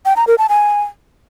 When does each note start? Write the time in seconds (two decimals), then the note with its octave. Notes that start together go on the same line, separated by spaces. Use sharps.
0.06 G5
0.16 A#5
0.27 A#4
0.38 A5
0.49 G#5